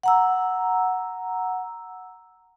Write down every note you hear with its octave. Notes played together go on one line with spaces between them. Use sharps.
F#5 A#5 E6